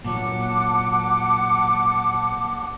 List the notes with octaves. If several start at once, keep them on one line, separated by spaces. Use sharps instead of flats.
A#2 F#3 F#5 A5 D6